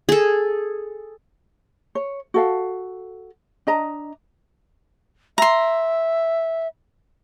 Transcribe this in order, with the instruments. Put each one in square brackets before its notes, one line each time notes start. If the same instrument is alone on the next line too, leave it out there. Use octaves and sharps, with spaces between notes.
[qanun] G#4 A4
[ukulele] C#5
F#4 A4 F5
D4 D#5 A#5
[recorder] E5 [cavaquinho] A#5 C6